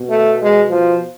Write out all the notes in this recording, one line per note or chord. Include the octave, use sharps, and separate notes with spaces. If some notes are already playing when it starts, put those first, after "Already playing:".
Already playing: B2
A3
G#3
F3